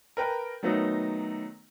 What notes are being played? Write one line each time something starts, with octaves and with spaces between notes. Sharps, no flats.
A#4 B4 G5 A5
D#3 F#3 A3 B3 D#4